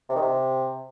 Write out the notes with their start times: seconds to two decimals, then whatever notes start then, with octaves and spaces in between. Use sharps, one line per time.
0.09 C3
0.16 D#3
0.22 C3